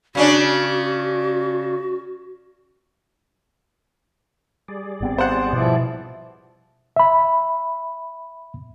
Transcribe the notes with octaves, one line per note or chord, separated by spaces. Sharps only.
C#3 C#4 D4 F#4
G3 G#4 D5
G#1 B3 C4
C5 F#5
B2 F3 E4
E5 B5